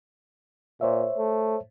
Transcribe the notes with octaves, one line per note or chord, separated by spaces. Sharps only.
A#2 C5 C#5 E5
A3